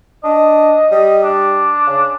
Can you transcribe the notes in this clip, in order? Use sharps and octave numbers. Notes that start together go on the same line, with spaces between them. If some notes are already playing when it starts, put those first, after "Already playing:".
D4 D#5
G3
D4
C#3